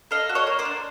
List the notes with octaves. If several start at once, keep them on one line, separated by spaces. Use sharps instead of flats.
A4 D#5 F5
F#4
C#5 D#5
A#3
C5 D5
D4